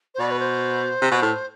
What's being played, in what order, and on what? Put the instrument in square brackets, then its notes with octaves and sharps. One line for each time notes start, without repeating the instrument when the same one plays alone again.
[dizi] C5
[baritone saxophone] B2 [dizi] D5
[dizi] B4
C5
[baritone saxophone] C3
B2
A2